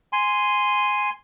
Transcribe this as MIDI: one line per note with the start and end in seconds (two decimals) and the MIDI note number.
0.13 1.10 80
0.13 1.10 84